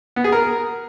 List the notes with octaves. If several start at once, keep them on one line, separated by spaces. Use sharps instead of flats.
B3
G#4
A#4